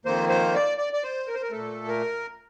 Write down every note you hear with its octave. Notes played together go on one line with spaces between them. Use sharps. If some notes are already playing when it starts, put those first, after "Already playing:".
F2 D#3 A#3 C5
C5
D5
D5
D5
C5
A#4
C5
A#4
A#2 A3 A4
A#4